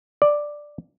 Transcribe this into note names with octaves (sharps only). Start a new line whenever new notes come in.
D5